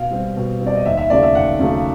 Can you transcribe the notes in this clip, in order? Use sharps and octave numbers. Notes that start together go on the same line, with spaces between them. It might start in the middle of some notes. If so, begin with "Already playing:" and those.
Already playing: B2 F5
G3 C4
B2
G3 C4
D5
D#5
D#2 E5
E5
C#3 F#3 A3 D5
E5
D#2 F#5
C#3 F#3 A3